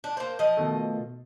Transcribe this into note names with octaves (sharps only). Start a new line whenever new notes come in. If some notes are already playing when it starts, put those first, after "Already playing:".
D4
A#3 C5
F3 D#5
B2 D#3 A3